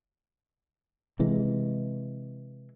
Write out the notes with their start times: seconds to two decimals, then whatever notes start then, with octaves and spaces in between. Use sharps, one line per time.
1.19 C3 E3 G#3